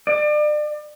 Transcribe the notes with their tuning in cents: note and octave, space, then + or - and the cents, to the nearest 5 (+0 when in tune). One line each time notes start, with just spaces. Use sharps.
D5 +35